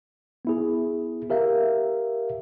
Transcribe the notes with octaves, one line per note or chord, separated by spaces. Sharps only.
B3 E4 G#4
G4 A#4 E5 F5